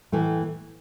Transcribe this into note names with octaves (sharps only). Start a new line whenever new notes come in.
A2 E3 A3